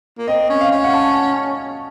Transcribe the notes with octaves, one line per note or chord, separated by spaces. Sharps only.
A#3
C4 D#5
C#4
F5
C#4
F#5
A5